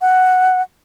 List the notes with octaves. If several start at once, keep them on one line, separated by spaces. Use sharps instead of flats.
F#5